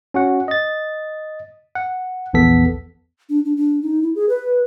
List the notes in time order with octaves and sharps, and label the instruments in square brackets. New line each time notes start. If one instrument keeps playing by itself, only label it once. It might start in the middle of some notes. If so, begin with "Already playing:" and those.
[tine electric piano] C#4 F#4 F#5
D#5 A6
F#5
A#1 E2 B3 A4 B6
[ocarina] D4
D4
D4
D#4
E4
G#4
B4